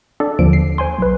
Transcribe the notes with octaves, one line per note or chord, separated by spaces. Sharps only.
D4 A4 D5
D#2 D3 F3 D7
C7
C5 G#5 C6
B1 B4